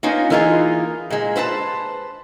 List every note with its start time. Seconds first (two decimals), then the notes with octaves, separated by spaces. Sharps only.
0.03 A#3 B3 C#4 D#4 F4
0.30 E3 A#3 D#4 F4 G#4
1.10 A#2 G#3
1.36 B4 C5 E5 A5